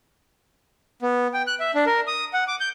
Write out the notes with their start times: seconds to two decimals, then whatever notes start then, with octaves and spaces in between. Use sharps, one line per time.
1.02 B3
1.34 G5
1.47 F#6
1.60 E5
1.75 D4
1.86 A#4
2.07 D#6
2.33 F#5
2.48 D6
2.60 G6